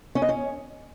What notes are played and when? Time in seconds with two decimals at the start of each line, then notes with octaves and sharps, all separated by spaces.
0.15 C#4
0.22 D#5
0.29 C#4